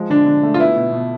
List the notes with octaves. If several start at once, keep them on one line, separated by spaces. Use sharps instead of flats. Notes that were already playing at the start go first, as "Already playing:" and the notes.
Already playing: F3 G#3
D3 D4
D3
A3
F4
B3 E4
B2
B2